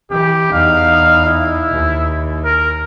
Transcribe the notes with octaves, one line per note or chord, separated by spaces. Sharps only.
E3 G4
E2 D#4 F5
E4
D#2
A#4